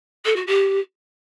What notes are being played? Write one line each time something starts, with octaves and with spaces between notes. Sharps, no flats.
A4
F#4
G4